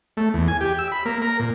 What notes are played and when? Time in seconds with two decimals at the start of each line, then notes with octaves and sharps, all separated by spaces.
0.17 A3
0.34 E2
0.48 G#5
0.61 G4
0.79 E6
0.92 B5
1.06 A#3
1.22 A#4
1.40 A#2